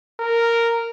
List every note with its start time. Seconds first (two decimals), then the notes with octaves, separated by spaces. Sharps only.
0.20 A#4